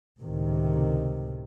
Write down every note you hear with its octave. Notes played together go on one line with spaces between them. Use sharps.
C#2 A2 C3 D#3